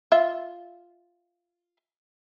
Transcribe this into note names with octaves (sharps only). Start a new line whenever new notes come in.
F4 E5